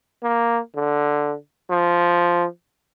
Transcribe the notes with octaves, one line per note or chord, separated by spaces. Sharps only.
A#3
D3
F3